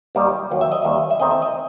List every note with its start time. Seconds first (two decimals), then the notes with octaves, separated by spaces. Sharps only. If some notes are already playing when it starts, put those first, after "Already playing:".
0.15 D#2 D#3 G3 D#4
0.51 D#2 D#3 F#3
0.61 E5
0.72 D#5
0.82 D#2 D#3 G3 E5
1.11 E5
1.19 E2 D#3 A3 C4 D#4 D#5
1.31 E5
1.42 D#5